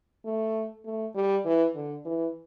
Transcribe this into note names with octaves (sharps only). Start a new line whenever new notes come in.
A3
A3
G3
E3
D3
E3